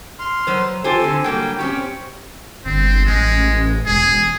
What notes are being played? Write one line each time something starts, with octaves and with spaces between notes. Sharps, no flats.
C6 F6
F#3 B4 C5
F4 G4 A4 C5 G#5
D3 C4
F#3 G3 A#3 G5
C4 C#4 G4 C#6
G1 C4
A1 G#3
E1 G#4